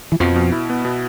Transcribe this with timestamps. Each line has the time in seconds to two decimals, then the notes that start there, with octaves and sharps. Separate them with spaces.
0.12 E3
0.20 F2 B2 F3
0.36 B2
0.52 E4
0.70 B3
0.85 B2